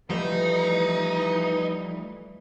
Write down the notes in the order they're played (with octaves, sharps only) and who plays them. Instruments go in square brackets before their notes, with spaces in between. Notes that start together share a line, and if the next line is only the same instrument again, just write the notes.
[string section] E3 [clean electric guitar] F3 G3 A3 [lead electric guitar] D#4 [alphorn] B4